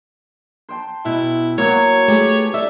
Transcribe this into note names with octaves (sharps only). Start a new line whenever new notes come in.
C5 G5 A5
B2 E4 B4
F#3 A#3 E4 F#4 C#5
A3 G4 G#4 B4
D4 D#4 A4 E5